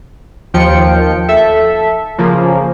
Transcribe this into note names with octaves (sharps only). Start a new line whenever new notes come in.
D#2 F3 F4 G5 C#7
A4 E5
C#3 F3 A#3